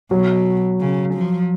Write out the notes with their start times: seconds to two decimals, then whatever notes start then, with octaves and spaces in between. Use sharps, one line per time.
0.11 B2 F#3
0.81 C#3
1.14 F3